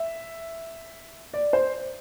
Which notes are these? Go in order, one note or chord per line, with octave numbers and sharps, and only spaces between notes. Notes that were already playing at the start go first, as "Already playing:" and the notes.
Already playing: E5
D5
C5